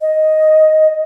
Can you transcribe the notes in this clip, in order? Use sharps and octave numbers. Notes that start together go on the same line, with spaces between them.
D#5